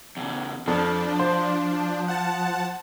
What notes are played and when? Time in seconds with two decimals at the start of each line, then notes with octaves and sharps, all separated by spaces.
0.17 E2 C#3
0.67 F2 F3 D4
1.19 C5
2.08 F#5 A5